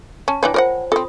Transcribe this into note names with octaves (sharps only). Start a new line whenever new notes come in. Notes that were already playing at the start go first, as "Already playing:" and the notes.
C#4 A5
E3 D4 B4 C#5 G5 G#5
F4 A#4 C5 D5 F#5
C4 F4 A4 D#6